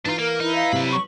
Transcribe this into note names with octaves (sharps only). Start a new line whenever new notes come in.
E3 D4 D#4 F4
A#3 A#4
D#4 E4
F5
C3 F#3 B5
C#6